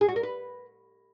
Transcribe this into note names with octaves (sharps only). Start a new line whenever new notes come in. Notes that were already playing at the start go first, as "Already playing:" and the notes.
G#4
F#4
A#4
B4